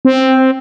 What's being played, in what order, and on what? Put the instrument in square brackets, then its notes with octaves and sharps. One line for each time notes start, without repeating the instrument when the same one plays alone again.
[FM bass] C4